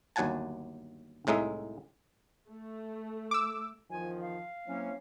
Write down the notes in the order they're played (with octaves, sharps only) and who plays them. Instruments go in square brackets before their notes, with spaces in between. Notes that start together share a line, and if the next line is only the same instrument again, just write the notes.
[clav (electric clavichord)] G1 D#2 F#3 F#5 G#5 A5
C2 A2 G#3 D#4 E5
[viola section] A3
[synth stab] D6 E6
[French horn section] E2 D#3 F3 [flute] G#5
[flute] F5
[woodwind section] F#3 A#3 C#4 [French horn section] C4 E4 C#5